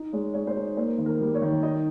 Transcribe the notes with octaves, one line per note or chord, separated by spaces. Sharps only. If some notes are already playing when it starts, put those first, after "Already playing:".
Already playing: D#4
G#3 C#5
G#3 C#5
C5
D#4 C#5
A#3 C5
D#3
A#4
G3
C#5
D#3
D#4 D#5